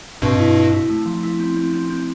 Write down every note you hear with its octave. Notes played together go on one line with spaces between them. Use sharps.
G2 B2 C4
E4
E4
E4
A3
F3
E4
C4
C4
C4
C4